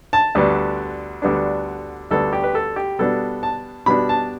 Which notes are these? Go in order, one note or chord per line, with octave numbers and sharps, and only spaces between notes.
A5
D2 D3 G3 B3 D4
D2 D3 G3 B3 D4
D2 D3 G3 B3 D4 A4
G4
B4
A4
G4
B2 G3 B3 D4 A4
A5
B2 G3 B3 D4 B5
A5